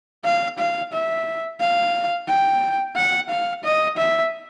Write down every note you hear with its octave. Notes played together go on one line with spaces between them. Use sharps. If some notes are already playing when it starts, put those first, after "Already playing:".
F5
F5
E5
F5
G5
F#5
F5
D#5
E5